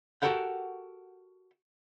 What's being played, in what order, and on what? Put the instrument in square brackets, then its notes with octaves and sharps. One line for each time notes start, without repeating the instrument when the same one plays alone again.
[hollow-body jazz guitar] F#4 G4 A4 A#4 F#5 G5